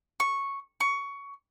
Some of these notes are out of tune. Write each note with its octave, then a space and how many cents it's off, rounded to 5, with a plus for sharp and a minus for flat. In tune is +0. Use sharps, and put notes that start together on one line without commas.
C#6 -5
C#6 +15